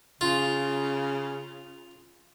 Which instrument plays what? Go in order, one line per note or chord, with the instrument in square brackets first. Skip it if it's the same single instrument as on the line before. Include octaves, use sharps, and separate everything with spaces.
[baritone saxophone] C#3 [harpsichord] F4